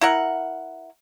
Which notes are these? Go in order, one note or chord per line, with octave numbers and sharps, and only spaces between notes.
E4 A#4 F#5